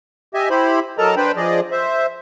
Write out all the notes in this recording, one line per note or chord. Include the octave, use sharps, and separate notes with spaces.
G4 D#5 E5 G#5
E4 G4 C5 B5
F#3 A4 A#4 D#5 A5 A#5
D4 B4 C5 G5 B5
F3 G#4 D5 D#5
C5 E5